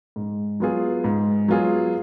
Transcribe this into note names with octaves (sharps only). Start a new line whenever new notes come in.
G#2
F#3 B3 F4 G#4
G#2
F#3 B3 F4 G#4